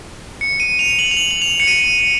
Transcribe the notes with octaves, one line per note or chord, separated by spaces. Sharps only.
C#7
D#7
F7
F#7
F7
F#7
F#7
F7
C#7
D#7